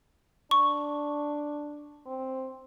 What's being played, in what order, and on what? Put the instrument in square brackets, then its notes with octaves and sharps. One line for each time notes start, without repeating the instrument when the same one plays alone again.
[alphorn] D4 [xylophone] C#6
[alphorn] C4